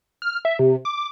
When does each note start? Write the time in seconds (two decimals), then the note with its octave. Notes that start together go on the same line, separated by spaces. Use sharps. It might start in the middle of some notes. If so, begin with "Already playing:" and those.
0.22 F6
0.45 E5
0.59 C3
0.85 D6